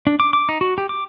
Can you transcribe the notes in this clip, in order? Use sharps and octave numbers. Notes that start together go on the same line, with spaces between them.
D4
D6
D6
D#4
F#4
G4
D6